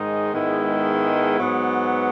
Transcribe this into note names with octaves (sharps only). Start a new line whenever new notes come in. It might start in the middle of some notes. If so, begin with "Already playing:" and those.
Already playing: G#2 D#3 G#3 D#4
G#2 D#3 G#3 B3 E4
G#2 F#3 B3